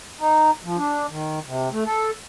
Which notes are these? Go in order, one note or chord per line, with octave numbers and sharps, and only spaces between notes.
D#4
F3
D4
D#3
C3
A3
A4